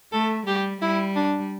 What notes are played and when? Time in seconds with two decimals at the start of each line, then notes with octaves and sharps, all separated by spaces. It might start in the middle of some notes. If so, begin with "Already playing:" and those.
0.12 A3 A4
0.46 G3 G4
0.81 G3 E4
1.16 D4